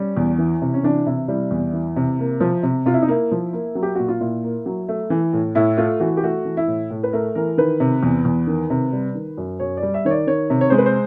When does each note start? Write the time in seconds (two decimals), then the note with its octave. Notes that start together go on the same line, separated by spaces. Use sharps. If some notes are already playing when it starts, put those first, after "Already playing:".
Already playing: G3 C#4
0.17 E2
0.38 E3
0.62 C3
0.74 C#4
0.83 E3 D4
1.06 C3 E4
1.28 G3 E4
1.51 E2
1.73 E3
1.96 C3
2.19 A#3
2.40 F3
2.63 C3
2.86 C3 F4
2.94 E4
3.02 D#4
3.08 A#3 E4
3.31 F3
3.53 A#3
3.75 F#3
3.83 G4
3.95 A#2 F#4
4.08 F4
4.20 A#2 E4
4.44 A#3
4.66 F#3
4.88 A3
5.10 E3
5.33 A2
5.55 A2 E4
5.78 A3 F4
6.00 E3 F#4
6.17 G4
6.24 A3 F#4
6.45 E3
6.57 E4
6.67 A2
6.91 A2
7.03 B4
7.13 A3 A#4
7.35 E3 A#4
7.58 D#3 B4
7.80 C3
8.03 E2
8.25 E2
8.47 D#3
8.70 C3
8.93 G3
9.15 D#3
9.38 F#2
9.59 F#2 C#5
9.77 D5
9.83 G3
9.94 E5
10.05 D#3 C#5
10.11 D5
10.27 D#3 C#5
10.50 C3
10.61 C#5
10.70 G#3 C5
10.78 B4
10.86 C5